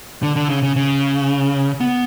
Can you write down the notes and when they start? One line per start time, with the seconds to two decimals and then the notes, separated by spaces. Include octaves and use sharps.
0.23 D3
0.36 D3
0.50 C#3
0.63 C#3
0.76 C#3
1.80 B3